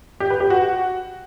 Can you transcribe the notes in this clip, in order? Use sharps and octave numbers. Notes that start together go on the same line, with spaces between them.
G4
B4
G4
F#4